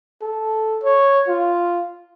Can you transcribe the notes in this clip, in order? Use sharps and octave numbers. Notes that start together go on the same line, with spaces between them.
A4
C#5
F4